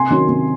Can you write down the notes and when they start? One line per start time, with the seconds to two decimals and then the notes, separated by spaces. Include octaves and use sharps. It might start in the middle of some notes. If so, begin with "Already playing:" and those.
Already playing: C3 G#5 C6
0.10 D#3 F#3 C#4
0.28 C3